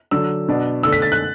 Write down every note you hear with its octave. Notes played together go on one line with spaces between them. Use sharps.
D3 F#3 D4 E6
B2 B3 D4
D3 A3 D4 E6
B6
A6
F#6